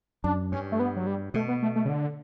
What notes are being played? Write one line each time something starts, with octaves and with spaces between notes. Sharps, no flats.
F#2 D4
G2 C#4
A3
B3
F#3
G3
B2 A3
B3
A3
A3
C#3
D3